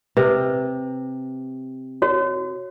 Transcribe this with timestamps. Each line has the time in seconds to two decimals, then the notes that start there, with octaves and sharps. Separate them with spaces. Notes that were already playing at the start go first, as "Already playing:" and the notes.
0.17 C3 B4
2.02 F#4 C#5